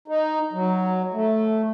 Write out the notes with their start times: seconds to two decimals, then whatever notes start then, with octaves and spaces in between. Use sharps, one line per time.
0.08 D#4
0.53 F#3
1.13 A3